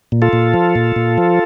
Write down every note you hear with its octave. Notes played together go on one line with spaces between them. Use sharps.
A#2
F4 A4
A#2
F3
A#2
A#2
F3